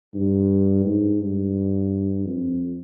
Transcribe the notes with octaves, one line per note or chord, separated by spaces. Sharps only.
G2
G#2
G2
F2